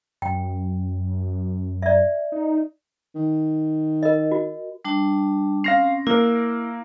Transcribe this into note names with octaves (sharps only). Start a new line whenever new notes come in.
F#2 G5
D5 E5
D#4
D#3
A#4 D#5
F#4
G3 D4 A5
C4 C#4 F5 A#6 C7
A#3 E4 A#4